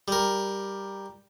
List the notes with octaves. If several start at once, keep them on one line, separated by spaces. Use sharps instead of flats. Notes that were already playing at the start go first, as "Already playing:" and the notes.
G3 A#4